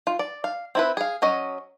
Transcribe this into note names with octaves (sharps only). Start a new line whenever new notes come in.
F4
D5
F5
C4 E4 B4
G#4 F5
F#3 C#4 D#5